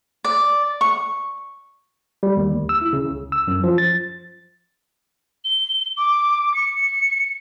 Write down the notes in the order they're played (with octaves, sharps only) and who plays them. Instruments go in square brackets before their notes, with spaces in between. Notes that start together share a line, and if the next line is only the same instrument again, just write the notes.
[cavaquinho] D5
C#6
[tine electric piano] G3
D#2
D2
E6
E4
C#3
C#2
E6
F#2
F3
A6
[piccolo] G7
D6
C#7